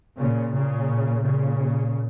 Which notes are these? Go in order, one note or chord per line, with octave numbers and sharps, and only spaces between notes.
A#2 C#3
A#2 C#3
A#2 C#3